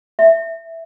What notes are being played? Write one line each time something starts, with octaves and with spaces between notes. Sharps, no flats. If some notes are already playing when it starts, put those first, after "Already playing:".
E5